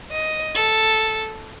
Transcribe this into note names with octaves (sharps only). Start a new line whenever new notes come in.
D#5
A4